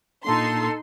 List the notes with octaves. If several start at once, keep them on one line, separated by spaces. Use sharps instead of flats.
A#2 A#3 D4 D#4 A4 C6